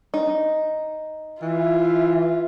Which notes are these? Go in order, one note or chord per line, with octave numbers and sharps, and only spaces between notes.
D#4
E3 F4 E5